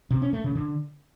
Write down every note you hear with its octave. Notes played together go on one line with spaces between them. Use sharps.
C3
C#4
A3
C#3
D3